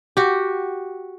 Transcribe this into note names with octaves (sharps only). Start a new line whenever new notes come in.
F#4 G4